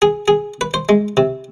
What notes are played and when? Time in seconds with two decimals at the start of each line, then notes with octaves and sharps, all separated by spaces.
0.02 G#4
0.28 G#4
0.61 B4
0.74 C5
0.89 G#3
1.17 C3